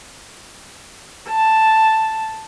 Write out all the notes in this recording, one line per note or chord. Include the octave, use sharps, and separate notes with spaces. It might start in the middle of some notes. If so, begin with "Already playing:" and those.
A5